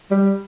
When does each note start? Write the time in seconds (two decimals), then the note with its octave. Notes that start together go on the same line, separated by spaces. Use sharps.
0.11 G3